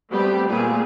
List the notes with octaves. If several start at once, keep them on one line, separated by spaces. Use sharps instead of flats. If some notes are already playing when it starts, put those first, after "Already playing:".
G3 A3 B3 C4 G4
A#2 G3 A3 B3 G#4